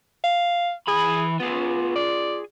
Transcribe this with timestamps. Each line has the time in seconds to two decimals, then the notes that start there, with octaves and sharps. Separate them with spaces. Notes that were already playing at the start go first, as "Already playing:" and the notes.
0.24 F5
0.88 E3 G#4 B5
1.40 B3 F4 G#4
1.96 D5